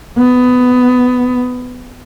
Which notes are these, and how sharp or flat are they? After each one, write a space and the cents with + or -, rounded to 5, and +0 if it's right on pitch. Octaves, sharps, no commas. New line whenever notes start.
B3 +15